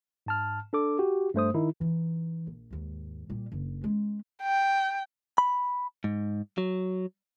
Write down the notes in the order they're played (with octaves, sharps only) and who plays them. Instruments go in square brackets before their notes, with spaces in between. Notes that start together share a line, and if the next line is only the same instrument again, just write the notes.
[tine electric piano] G#2 A5 F6
D4 A4 D6
F#4 G4
G2 A3 C5 D#6
D#3 D#4 E4
[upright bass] E3 D#4
A#1
D#2 G#2
A#2 G3
F#1 D4
G#3 C#4
[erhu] G5
[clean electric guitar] B5
G#2
F#3